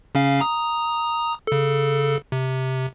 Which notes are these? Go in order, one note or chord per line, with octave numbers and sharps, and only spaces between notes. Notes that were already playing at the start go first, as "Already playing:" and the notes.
C#3 C#4 F5
A#5 D#6
C#3 A4
C3